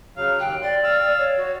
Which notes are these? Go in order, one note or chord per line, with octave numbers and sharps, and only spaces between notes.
C#3 F#3 F5
D#2 G5 F#6
D5 C6
F5 E6
C#5
F#4